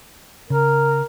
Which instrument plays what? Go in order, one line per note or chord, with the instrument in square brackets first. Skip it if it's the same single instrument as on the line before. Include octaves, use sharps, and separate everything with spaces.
[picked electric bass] C#3 [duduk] A#4